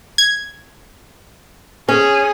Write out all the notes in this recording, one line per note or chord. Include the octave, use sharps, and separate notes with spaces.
G#6
C#4 G#4